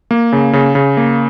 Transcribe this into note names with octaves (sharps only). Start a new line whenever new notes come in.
A#3
C#3
C#3
C#3
A#3